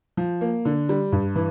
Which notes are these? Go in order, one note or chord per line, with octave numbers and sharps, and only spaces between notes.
F3
A#3
D3
G3
G2
E3